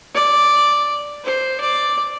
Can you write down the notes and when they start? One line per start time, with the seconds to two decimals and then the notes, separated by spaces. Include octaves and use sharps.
0.15 D5
1.24 C5
1.60 D5